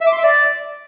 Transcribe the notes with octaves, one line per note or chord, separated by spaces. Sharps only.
E5
D6
C6
E5
D5